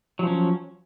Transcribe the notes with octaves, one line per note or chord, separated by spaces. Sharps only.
F3 F#3 C#4